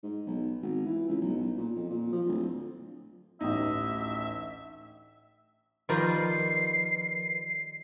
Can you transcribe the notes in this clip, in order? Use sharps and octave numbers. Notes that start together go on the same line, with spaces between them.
G#2
B1
G#1
E3
C#2
B1
B1
A#2
F2
A#2
F3
D1
A1 D2 D#4 E5
D#3 F3 G3 F4 A#4 B4 C7